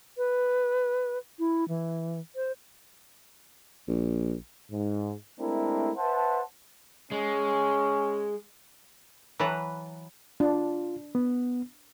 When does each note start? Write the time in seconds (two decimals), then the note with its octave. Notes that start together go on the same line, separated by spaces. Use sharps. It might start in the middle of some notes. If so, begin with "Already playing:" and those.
0.18 B4
1.39 E4
1.69 E3
2.36 C5
3.88 A#1
4.72 G#2
5.40 G#3 A3 C4 D4 E4 A#4
5.97 B4 C5 E5 F#5 A5
7.11 G#3 C#4
9.39 E3 F#3 B4 A5 A#5
10.40 D4 F4
11.15 B3